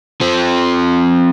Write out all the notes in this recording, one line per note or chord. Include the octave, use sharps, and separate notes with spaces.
F3 C4